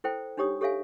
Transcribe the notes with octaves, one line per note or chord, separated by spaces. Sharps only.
E4 A4 C5 G5
D4 D#4 G4 C#5 D#6
G4 A4 C#5 E5 F5 G#5